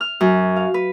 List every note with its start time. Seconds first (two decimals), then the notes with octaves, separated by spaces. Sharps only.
0.01 F6
0.21 F#2
0.56 F5
0.74 B4